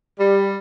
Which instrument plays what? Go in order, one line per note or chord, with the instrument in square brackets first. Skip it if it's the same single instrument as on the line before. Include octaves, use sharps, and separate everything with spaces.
[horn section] G3